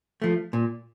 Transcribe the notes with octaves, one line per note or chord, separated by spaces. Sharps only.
F3 A3
A#2